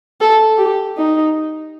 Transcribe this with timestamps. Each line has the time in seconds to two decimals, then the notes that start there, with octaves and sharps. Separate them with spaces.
0.21 A4
0.58 G4
0.97 D#4